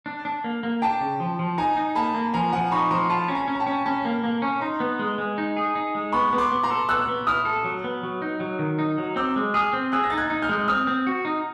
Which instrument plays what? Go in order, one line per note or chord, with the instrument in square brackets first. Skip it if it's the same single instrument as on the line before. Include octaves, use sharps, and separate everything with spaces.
[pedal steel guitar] D4
D4
A#3
A#3
[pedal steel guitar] D4 [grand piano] G5 A5
[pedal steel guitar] C#3
F3
F3
[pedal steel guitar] D#4 [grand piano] G#5 A#5
[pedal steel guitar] D#4
[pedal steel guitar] A#3 [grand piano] A5 B5
[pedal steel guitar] A#3
[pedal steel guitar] F3 [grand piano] G#5 A#5
[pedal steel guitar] F3 [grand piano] F#5 G#5
[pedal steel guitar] D#4 [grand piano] B5 C#6
[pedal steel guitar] F3 [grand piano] A#5 C6
[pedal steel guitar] F4 [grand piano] A5 B5
[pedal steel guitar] C#4
[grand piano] G#5 A#5
[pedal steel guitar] C#4
[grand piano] A#5
G5 A5
[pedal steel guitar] C#4
[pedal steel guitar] C#4 [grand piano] A5 B5
[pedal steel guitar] A#3
A#3
C#4
[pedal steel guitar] D#4 [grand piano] A#5 C6
[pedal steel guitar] B3
G#3
G#3
D#4
G#4
D#4
G#3
[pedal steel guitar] B3 [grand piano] B5 C#6
[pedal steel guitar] B3
[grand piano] C6 D6
[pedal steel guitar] B3
[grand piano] A#5 C6
[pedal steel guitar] A4
[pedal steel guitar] B3 [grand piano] E6 F#6
[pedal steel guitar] B3
[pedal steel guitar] E4 [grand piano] D#6 F6
[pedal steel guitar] A4
F#3
B3
F#3
D#4
F#3
D#3
D#4
F#3
[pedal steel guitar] C4 [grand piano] D6 E6
[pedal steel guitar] G#3
[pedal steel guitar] G#4 [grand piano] D#6 F6
[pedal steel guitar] C4
[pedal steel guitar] G#4 [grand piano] E6 F#6
[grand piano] A#6
[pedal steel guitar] D#4 [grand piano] A6
[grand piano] F#6 G#6
[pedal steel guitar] D#4
[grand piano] F6 G6
[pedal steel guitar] G#3
[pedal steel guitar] C4 [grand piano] D#6 F6
[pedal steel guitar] C4
F#4
D#4